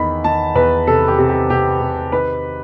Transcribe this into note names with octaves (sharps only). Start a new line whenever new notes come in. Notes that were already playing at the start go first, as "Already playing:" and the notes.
Already playing: E2 D#3 B5
D#3 A5
E2 B4
C3 A4
G4
C3
G4
C3 G4
C3
D#3 B4